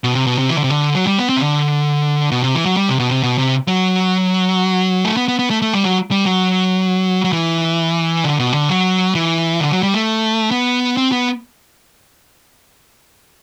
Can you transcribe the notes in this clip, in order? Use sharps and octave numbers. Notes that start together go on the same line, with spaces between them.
B2
C3
B2
C3
E3
D3
C3
D3
F#3
G3
B3
C4
C3
D3
B2
C3
E3
F#3
G3
C3
B2
C3
B2
C3
F#3
A3
B3
B3
B3
A3
A3
G3
F#3
G3
F#3
F#3
E3
D3
B2
D3
F#3
E3
D3
F#3
G3
A3
B3
C4
B3